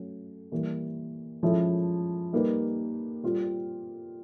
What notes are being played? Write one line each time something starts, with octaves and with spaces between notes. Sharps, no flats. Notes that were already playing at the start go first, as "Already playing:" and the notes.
Already playing: F#3 A3 C#4
E3 G3 A#3
F3 G#3 C#4 E4 A4
G3 A#3 D#4 G4 B4
G3 C4 F4